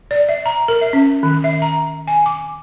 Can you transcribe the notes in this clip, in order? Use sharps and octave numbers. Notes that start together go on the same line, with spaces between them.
D5
E5
A#5
A#4
E5
C#4
D#3
E5
A#5
G#5
D6